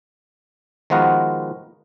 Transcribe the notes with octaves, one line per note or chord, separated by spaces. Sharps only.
D#3 F3 G#3 B3 F#4 A#4